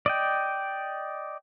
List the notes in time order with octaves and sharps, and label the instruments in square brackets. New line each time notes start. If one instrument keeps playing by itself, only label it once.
[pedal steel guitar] D5 D#5 G5